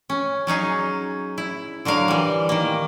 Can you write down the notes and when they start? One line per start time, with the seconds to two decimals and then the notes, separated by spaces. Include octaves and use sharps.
0.10 C#4
0.47 F#3 C#4 D#4 G#4
1.38 E4
1.85 D3 F#3 A#4 F5
2.08 E3 G3
2.49 D#3 A#3